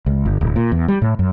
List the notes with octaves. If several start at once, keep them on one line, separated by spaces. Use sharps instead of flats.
C#2
G1
D1
A#2
E2
G3
A2
F#2